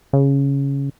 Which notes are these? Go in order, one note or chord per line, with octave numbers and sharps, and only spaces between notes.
C#3